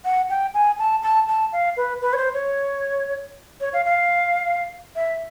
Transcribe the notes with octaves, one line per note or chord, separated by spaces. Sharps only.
F#5
G5
G#5
A5
A5
A5
F5
B4
B4
C#5
C5
C#5
C#5
F5
F5
E5